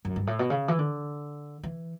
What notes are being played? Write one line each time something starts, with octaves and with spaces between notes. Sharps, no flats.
F#2
G2
A2
B2
C#3
E3
D3
E3